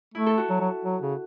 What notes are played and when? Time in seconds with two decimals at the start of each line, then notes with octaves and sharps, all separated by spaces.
0.14 A3 E4
0.26 A4
0.38 F#4
0.50 F#3
0.61 F#3
0.85 F#3
1.02 C#3